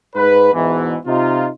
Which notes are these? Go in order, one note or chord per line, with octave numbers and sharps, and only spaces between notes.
G#2 B4
E2 G#2 B2 E3
C3 D#4 F4